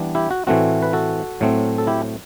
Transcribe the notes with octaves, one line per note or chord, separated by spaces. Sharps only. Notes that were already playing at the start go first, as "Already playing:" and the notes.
Already playing: E3 G3 B3 D4
E4 G4
F#4
A2 E3 A3 C4 F#4
B4
F#4 A4
A2 F#3 A3 C4
A4
E4 G4